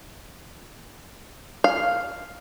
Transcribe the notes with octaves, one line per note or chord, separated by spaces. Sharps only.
F5